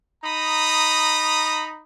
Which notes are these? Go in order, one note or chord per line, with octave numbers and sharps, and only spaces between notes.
D#4 A#5 B5 D#6